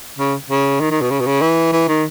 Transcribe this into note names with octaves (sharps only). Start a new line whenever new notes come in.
C#3
C#3
D#3
D#3
B2
C#3
B2
C#3
E3
E3
D#3